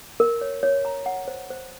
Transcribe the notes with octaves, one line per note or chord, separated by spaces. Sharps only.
A#4
C#5
C#5
A#5
F#5
C5
C5